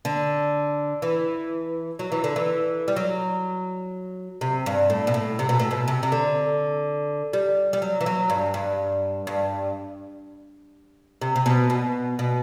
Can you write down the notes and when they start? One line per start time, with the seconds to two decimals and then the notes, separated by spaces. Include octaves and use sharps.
0.05 D3
1.02 E3
1.99 F#3
2.12 E3
2.24 D3
2.36 E3
2.88 G3
2.96 F#3
4.41 C3
4.66 G2
4.90 A2
5.07 B2
5.14 A2
5.39 C3
5.49 B2
5.60 A2
5.71 B2
5.88 C3
6.03 C3
6.12 D3
7.33 G3
7.73 G3
7.82 F#3
8.01 E3
8.06 F#3
8.30 G2
8.54 G2
9.27 G2
11.21 C3
11.36 C3
11.46 B2
11.70 B2
12.19 B2